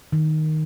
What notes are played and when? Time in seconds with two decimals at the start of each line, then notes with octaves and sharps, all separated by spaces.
0.12 D#3